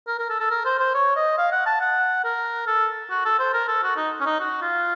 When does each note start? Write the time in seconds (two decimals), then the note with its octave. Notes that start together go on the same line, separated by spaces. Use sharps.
0.07 A#4
0.19 A#4
0.30 A4
0.40 A4
0.51 A#4
0.65 C5
0.79 C5
0.94 C#5
1.16 D#5
1.38 F5
1.52 F#5
1.66 A5
1.81 F#5
2.24 A#4
2.67 A4
3.10 F#4
3.25 A4
3.39 C5
3.53 A#4
3.68 A4
3.83 F#4
3.96 D#4
4.20 C#4
4.26 D#4
4.40 F#4
4.61 F4